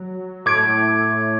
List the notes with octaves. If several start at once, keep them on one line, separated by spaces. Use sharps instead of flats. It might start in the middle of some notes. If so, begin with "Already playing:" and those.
Already playing: F#3
A2 A3 D6 G#6 D7